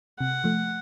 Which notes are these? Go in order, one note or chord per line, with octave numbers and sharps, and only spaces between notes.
C3 F#5
F3 A3